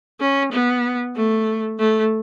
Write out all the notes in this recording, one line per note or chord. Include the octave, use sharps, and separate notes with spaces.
C#4
B3
A3
A3